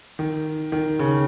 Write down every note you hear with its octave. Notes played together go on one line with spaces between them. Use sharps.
D#3
D#3
C#3